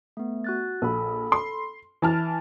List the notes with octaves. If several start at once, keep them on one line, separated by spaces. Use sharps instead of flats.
A3 B3
F#4 F#6 A6
A#1 A4 B5
C6
E3 E4 A5 F6 A6